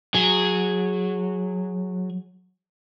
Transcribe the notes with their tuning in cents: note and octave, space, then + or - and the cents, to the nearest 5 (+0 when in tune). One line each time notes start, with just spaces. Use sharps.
F#3 -15 G#4 +0